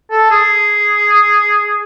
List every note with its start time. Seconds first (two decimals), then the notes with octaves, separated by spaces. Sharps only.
0.11 A4
0.31 G#4